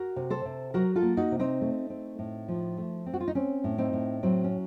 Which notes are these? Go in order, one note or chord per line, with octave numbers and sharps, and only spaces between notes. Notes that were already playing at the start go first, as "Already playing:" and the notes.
Already playing: F#4 A#4
C3
A4 C5
C3
F#3 F#4 A#4
F4 A4
A#3
D#4 F#4
C3
C4 D#4
A3
C4
A2
F3
A3
C4
F#4
F4
D#4
C4 C#4
A2
C4 D#4
A2
F#3 C4
C#4